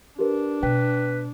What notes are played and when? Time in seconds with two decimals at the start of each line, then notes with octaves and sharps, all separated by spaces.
0.19 D4 G4 A#4 B4
0.63 B2 B4 G5